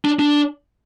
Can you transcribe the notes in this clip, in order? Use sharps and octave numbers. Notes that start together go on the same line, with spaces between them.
D4
D4